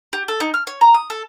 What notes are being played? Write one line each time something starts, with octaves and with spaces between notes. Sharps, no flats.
G4
A4
D#4
F6
C#5
A#5
D#6
A4